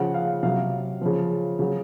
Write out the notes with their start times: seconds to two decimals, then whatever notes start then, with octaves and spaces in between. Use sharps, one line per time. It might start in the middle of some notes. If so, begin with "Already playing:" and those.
Already playing: C#3 F3 F#5
0.14 F5
0.43 C3 F#3 F5
1.01 C#3 F3
1.59 C#3 F#3